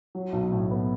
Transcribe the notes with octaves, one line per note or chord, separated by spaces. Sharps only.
F#3
B1
A2
B3